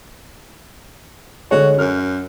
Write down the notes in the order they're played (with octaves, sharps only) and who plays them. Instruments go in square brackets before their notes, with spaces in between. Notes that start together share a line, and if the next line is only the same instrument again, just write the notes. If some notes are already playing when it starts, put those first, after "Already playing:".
[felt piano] D3 G#3 C#5 [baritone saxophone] F#4
[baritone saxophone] F#2 [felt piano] F6